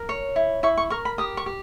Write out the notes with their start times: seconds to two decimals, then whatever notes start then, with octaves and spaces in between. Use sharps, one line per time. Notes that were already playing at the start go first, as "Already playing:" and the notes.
Already playing: A#4
0.09 C#5
0.36 E4
0.63 E4 C#6
0.77 C#6
0.90 A#4 C#6
1.05 B5
1.18 G4 D#6
1.37 C#6
1.46 G4